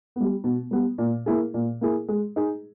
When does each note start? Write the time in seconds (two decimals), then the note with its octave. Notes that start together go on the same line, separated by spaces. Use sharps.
0.16 G3 B3
0.44 B2
0.71 G3 B3
0.98 A#2
1.26 A#3 E4 G#4
1.54 A#2
1.81 A#3 E4 G#4
2.08 G#3
2.36 D#4 G#4